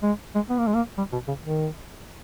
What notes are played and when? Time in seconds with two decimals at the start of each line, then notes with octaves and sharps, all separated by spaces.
0.03 G#3
0.35 G#3
0.49 B3
0.58 A#3
0.67 G#3
0.75 A#3
0.98 G3
1.13 B2
1.28 C#3
1.44 D#3